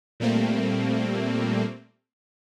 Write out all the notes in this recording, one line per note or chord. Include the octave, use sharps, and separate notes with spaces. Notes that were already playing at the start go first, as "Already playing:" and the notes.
A#2 G3 A3 A#3 C4